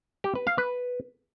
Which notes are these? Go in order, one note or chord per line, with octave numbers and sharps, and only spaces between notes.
G4
B4
F5
B4